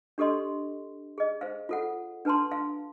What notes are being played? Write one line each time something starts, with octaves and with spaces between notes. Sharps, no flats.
D4 G4 A4 D#5 C6
G#4 D#5
C5 F5
F4 A4 F#5
D4 B4 A5 A#5 C6
F5